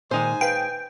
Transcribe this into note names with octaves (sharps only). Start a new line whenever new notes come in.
A#2 D#3 G#3 D#4 C5 G#5
B4 F5 G5